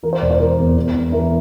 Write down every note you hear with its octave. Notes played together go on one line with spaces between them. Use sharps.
E3 A#4
C5
E1 D5
C5
E3 A#4
E2
E2
E2
E3 A#4